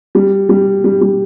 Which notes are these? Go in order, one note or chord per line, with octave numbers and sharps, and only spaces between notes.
G3
G3
G3
G3